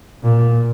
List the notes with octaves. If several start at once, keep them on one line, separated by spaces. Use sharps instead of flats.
A#2